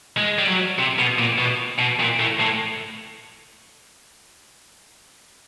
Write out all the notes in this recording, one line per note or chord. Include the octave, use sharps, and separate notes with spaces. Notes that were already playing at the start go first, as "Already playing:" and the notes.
G#3
G3
F#3
C3
B2
A#2
B2
B2
A#2
A2
A2